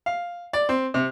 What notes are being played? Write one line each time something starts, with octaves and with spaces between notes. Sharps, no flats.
F5
D5
C4
C3